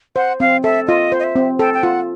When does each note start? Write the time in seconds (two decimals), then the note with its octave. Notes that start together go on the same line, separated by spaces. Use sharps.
0.16 C5 F#5
0.40 C4 F5
0.63 A4 E5
0.87 F4 D#5
1.12 C5
1.19 D#5
1.24 E5
1.36 C4
1.59 A4 G5
1.74 G5
1.83 F4 F#5